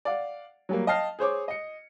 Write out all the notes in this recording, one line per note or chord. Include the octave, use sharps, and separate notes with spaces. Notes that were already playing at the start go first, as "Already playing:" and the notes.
D5 F5 F#5
F#3 G3 A#3
D#5 F5 G5 A5 F6 C7
G#4 C5 C#5 D6
D#5 C#7